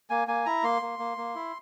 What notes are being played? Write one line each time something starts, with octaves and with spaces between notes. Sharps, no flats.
A#3 G#5
A#3 G#5
E4 A#5
A#3 C6
A#3
A#3
A#3
E4